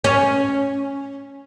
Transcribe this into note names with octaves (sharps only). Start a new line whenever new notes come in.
C#4